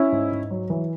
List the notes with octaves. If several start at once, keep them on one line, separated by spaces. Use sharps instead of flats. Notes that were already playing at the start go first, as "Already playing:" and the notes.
Already playing: C#4 E4
G#2
G#2
F#3
E3